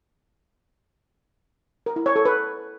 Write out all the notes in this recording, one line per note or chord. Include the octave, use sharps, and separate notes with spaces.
A#4
E4
C#5
A4
B4